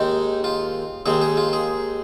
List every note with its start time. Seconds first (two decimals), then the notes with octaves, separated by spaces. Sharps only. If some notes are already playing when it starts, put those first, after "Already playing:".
Already playing: D#2 D#3 G#3 D#4
0.44 F4
1.06 D#2 D#3 G#3 G#4
1.21 G#4
1.37 F4
1.53 G#4